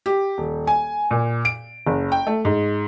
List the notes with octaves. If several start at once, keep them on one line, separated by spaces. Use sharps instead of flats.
G4
D#1
G#5
A#2
D7
F#1
G5
A3
G#2